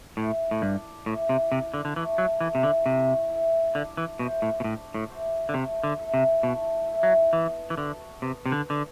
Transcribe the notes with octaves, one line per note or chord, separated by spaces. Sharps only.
A2 E4
A2
G2 A4 D5
A2 E4
C3
C3 A4 D5
D3
D3
E3 A3
F#3
E3 E4 A4
C3
D3
C3 A3
E4 A4
D3 D4
E3
B2 F#4 C5 E5
A2
B2
A2 D4
A2
F#4 C5 E5
D3
C3 A3
D3
E4 A4 E5
C3
B2 A3
E4 A4 E5
F#3
E3 B3
E3
D3 F#4 A4
C3 B3
C3
D3
D3 F#4 A4